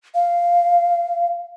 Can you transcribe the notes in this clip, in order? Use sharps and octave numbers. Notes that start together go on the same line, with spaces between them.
F5